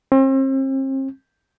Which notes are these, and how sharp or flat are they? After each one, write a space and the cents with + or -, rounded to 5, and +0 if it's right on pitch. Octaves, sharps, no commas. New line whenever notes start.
C4 +40